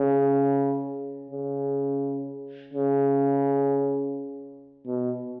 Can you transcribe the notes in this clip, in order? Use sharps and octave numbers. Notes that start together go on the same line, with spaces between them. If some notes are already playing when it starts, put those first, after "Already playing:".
Already playing: C#3
C#3
C#3
B2